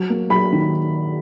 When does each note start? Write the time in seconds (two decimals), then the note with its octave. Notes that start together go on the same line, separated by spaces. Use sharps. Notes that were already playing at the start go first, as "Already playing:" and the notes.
Already playing: F#3
0.10 A#3
0.30 F#3 B5
0.52 D#3